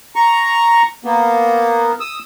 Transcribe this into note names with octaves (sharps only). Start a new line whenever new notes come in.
A#5 C#6
A#3 B3
D#6 E6